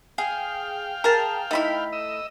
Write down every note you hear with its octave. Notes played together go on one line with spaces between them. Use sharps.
G#4 F5 G5
G#4 A#4 A5
A3 D#4 E4 B5
D#5 E6